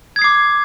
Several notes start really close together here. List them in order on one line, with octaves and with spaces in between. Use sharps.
G#6 D#6 C7 D6